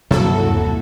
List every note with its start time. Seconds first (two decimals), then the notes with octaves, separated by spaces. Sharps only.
0.11 G2 C3 F3 F#3 A#3 E4 F#4 A4
0.48 D#2
0.60 A#3 C4